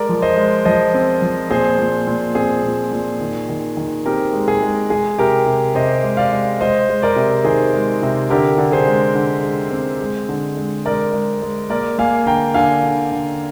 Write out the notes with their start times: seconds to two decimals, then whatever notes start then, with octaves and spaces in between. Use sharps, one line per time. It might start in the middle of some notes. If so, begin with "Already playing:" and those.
Already playing: G#3 A#4 D5
0.09 F3
0.22 C5 D#5
0.36 G#3
0.65 F3 C5 D#5
0.94 C4
1.22 F3
1.50 A#2 G#4 C5
1.79 A#2
2.07 A#2
2.35 C4 G#4
2.64 A#2
2.91 A#2
3.21 D#3
3.49 D#3
3.77 D#3
4.06 C4 G4 A#4
4.33 G#3
4.48 G#4
4.62 G#3
4.90 G#3 G#4
5.19 C3 G4 A#4
5.47 C3
5.75 C3 C5 D#5
6.03 G#3
6.17 D5 F5
6.32 G#3
6.60 G#3 C5 D#5
6.89 G#3
7.02 A#4 D5
7.16 C3
7.45 D#3 G#4 C5
7.74 G#3
8.02 C3
8.30 D3 G4 A#4
8.58 D3
8.72 G#4 C5
8.87 G#3
9.15 D3
9.43 G#3
9.72 C4
10.01 G#3
10.29 D3
10.57 G#3
10.86 G#3 A#4 D5
11.14 G#3
11.42 G#3
11.69 A#3 A#4 D5
11.98 A#3 F5 G#5
12.26 D3 G5 A#5
12.54 D3 F5 G#5
12.83 D3
13.12 D3